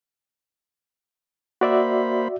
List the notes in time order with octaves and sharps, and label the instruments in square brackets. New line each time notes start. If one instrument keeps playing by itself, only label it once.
[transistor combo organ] A#3 C5 B5 [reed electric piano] F#4 D5 E5